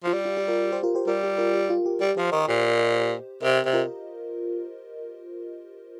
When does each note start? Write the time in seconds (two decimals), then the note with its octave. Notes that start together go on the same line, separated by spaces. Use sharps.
0.03 F3 F4
0.13 G3 G4
0.25 F4
0.37 G4
0.48 F4 A#4
0.72 G4 C5
0.83 F4 A#4
0.95 G4 C5
1.07 G3 F4 A#4
1.23 G4
1.38 F4 A#4
1.54 G4
1.70 F4
1.86 G4
2.01 G3 G4
2.17 F3 G4 C5
2.32 D#3 A#4 D#5
2.48 A#2 G4 C5
3.42 C3 A#4 D#5
3.65 C3
3.73 F4 A#4